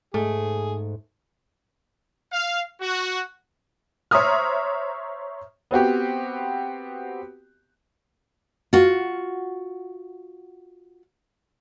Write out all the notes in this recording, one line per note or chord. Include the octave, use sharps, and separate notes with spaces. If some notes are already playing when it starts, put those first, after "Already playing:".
G#2 A3 G#4
F5
F#4
C5 C#5 E5 A#5 D#6 F6
B3 C4 F#4 G4
F4 F#4